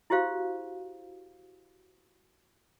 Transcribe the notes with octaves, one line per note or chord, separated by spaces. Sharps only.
E4 F#4 G4 C5 F5